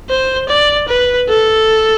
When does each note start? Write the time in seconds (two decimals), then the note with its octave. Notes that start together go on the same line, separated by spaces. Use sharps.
0.10 C5
0.49 D5
0.88 B4
1.29 A4